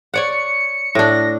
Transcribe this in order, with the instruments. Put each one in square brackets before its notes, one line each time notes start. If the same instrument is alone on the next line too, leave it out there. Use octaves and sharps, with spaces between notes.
[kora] C#5 D5 F#5 [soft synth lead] C#7
[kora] A2 D4 [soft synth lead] A#6